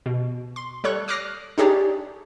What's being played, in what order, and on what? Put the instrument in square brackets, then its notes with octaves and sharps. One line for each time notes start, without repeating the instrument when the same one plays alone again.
[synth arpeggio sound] B2
C6
G3 A4 C#5 C#6 F#6
D6 D#6 F6 F#6 A#6 C7
D4 D#4 G4 G#4 C#5 D5